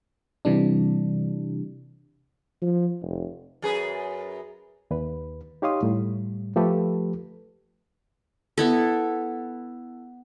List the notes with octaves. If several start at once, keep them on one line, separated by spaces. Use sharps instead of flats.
C3 E3 G3 D4
F3
F1
F#2 G#4 B4
D#2 B4
D#4 G4 C#5 F5 C6 D#6
A2 G3
F3 A3 G4 A4 B4
B3 E4 A4